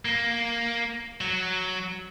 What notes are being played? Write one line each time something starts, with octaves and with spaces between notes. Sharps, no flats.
A#3
F#3